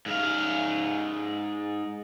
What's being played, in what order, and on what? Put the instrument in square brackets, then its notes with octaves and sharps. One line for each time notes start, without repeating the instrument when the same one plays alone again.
[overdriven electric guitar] G#2 F5